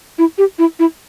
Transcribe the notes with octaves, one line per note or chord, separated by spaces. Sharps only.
E4
G4
E4
E4